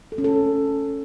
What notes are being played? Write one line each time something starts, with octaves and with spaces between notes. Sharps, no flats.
A4
C#4
A4